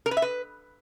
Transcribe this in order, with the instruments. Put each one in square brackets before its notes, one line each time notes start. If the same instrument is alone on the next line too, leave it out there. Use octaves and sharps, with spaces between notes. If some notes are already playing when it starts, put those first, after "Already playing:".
[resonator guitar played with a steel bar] A#4
B4
E5
B4